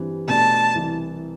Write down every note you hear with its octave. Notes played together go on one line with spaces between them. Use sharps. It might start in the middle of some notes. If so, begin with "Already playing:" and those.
Already playing: G2 E3 G3 C4
B2 A3 D4 A4 A5
C2 C3 E3